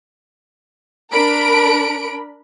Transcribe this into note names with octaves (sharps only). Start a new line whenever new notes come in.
D4 A#4 B5 D7